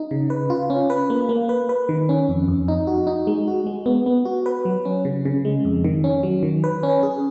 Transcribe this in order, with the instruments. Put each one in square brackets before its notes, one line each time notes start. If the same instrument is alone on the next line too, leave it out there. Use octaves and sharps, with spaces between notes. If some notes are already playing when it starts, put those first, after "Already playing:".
Already playing: [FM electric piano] D#4
C#3
B4
F4
C#4
B4
A#3
A#3
B4
B4
D#3
C#4
F2
F2
D#4
F#4
D#4
G#3
F#4
G#3
B3
B3
F#4
B4
F#3
C#4
C#3
C#3
G#3
F2
D#3
C#4
F#3
D#3
B4
C#4
G#4